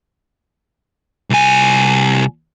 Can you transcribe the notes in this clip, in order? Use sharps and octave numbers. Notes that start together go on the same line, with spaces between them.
C2 G#5